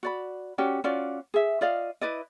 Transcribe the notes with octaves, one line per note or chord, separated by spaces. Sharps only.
F#4 D5 B5
C#4 F#4 G4 D5
C#4 F4 F#4 D5
G#4 E5
F4 D5 D#5 F5
E4 B4 D5 D#5